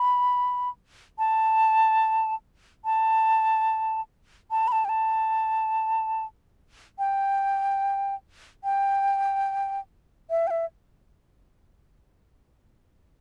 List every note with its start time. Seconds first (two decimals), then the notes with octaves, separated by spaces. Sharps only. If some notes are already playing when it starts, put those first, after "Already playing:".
Already playing: B5
1.18 A5
2.85 A5
4.51 A5
4.68 B5
4.72 A5
4.85 G5
4.89 A5
6.99 G5
8.64 G5
10.30 E5
10.47 G5
10.51 E5